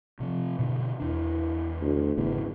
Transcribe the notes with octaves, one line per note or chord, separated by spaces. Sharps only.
C3 F3
B2 D3 E3
E2 E3 D4
D2
G#1 E2 C#3